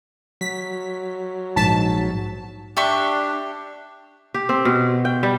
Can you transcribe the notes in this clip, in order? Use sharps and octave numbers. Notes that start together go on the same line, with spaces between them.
F#3 B6
A#1 G#2 A5 B6
D4 G4 E5 C#6
G4
C4
B2
G5
G3